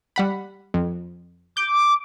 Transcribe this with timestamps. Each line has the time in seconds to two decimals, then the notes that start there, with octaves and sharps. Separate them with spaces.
0.16 G3 F#5 B5
0.74 F2
1.57 D6 G6